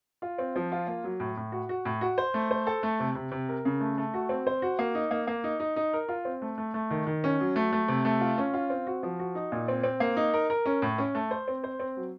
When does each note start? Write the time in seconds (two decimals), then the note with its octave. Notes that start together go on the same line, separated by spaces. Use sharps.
0.22 F4
0.38 C4
0.56 F3
0.72 F4
0.87 A#3
1.04 F#3
1.20 A2
1.37 A2
1.52 F#4
1.69 F#4
1.85 A2
2.01 F#4
2.18 C5
2.34 A3
2.51 C5
2.67 A4
2.83 A3
3.00 C3
3.15 C3
3.31 C3
3.49 A#4
3.65 C#3
3.81 A3
3.98 A3
4.14 F#4
4.29 C4
4.47 C5
4.62 F#4
4.79 A#3
4.95 D#4
5.11 A#3
5.27 A#3
5.44 D#4
5.60 D#4
5.76 D#4
5.93 A#4
6.09 F4
6.25 C4
6.42 A3
6.58 A3
6.74 A3
6.90 D#3
7.07 D#3
7.24 C#4
7.40 F#3
7.56 A3
7.72 A3
7.88 C3
8.05 A3
8.20 F4
8.38 C#4
8.54 F4
8.70 C4
8.87 F#4
9.03 F3
9.19 F#4
9.35 D#4
9.52 A#2
9.68 C4
9.83 C4
10.00 A#3
10.17 D#4
10.34 A#4
10.50 A#4
10.66 C#4
10.82 A2
10.98 C#4
11.15 A3
11.31 C5
11.48 C4
11.64 C5
11.80 C4
11.97 F#3